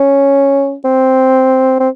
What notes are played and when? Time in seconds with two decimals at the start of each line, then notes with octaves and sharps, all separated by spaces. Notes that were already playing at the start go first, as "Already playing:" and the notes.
Already playing: C#4
0.84 C4
1.80 C4